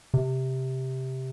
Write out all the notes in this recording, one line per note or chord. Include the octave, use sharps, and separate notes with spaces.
C3